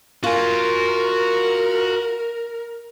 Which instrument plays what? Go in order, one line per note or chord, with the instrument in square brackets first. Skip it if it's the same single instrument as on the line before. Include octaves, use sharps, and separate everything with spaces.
[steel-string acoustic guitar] F4 [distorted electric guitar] F#4 G#5 [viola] A#4